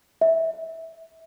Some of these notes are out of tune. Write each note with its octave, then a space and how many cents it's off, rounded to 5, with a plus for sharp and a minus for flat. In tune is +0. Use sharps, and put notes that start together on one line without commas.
E5 -15